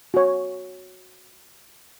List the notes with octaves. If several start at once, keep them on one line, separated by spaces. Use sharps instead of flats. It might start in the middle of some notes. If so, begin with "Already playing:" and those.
F#4 C#5